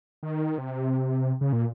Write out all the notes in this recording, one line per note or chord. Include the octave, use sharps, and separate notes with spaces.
D#3
C3
C#3
A#2